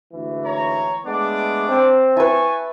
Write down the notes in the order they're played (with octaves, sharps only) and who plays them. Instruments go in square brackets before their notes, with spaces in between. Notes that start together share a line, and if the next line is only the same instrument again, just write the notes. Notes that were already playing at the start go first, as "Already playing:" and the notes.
[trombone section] D2 G#2 E3
[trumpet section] C#5 A#5
[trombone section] G#3 A3 B3 [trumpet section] D4 D6
[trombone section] C4
[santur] E4 B4 [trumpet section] G#5 A5 C#6